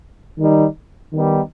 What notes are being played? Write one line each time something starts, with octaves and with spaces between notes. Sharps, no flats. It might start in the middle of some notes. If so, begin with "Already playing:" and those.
D#3 G3 D#4
D#3 G3 B3 D#4